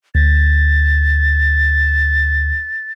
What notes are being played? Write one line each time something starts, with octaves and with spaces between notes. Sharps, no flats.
D2 A6